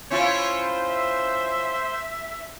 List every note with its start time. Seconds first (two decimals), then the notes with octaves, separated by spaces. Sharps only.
0.11 C#4 E4 F4 C5 C#5
0.89 E5